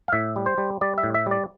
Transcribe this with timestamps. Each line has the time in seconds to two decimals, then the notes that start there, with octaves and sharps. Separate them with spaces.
0.08 F5
0.12 A2 E5
0.36 G3
0.46 C5
0.58 G3
0.81 G3 D5
0.98 E5
1.03 A2
1.14 E5
1.26 G3 D5